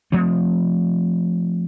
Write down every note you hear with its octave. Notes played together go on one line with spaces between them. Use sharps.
F3 A3 C4